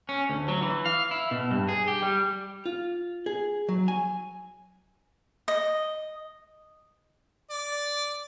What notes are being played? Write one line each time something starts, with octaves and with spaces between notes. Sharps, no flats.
C#4
D2
F#3
E3
F5
E4
B2
G2
G#4
G4
G3
F4
G#4
F#3
G#5
D#5
D5